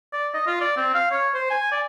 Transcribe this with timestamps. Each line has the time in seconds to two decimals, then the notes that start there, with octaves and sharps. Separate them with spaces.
0.13 D5
0.34 D#5
0.47 F4
0.61 D5
0.77 C4
0.94 F5
1.11 C#5
1.34 C5
1.51 G#5
1.72 D5